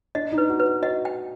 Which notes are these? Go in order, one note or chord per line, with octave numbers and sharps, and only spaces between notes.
D4 D#5
D#4
B4
F#4
B4
F#4 D#5
G5